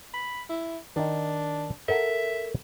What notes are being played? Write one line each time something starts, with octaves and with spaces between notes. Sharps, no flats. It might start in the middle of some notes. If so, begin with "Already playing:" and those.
B5
E4
D#3 D4 D#4
A4 A#4 E5 F#5